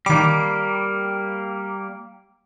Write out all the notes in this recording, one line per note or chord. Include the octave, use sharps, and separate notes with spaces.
D#3 G3 A#3 D6